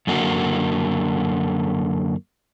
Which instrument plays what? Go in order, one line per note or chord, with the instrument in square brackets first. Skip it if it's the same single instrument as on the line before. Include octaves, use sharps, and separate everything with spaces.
[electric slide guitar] F#2 D3 A#3 F#4